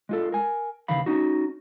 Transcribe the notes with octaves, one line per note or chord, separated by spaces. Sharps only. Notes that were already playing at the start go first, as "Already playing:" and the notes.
G#3 F4 A4
A#4 G#5
D#2 C#3 E3 F5 B5
C#4 D#4 F#4